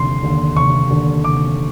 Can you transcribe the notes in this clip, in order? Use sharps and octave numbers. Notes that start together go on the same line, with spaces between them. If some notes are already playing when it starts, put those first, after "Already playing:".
Already playing: F1 D#2 D3 C6
D#2 D3
F1 C#6
D#2 D3
F1 D6